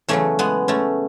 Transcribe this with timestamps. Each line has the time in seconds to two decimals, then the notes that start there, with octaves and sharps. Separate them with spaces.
0.08 E2 C#3 F#3 A3 C#4
0.39 G#3 B3
0.68 A3 C#4